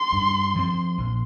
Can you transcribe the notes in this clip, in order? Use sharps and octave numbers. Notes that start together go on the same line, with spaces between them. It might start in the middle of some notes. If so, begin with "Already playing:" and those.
Already playing: C6
G2
F3 C4
A#1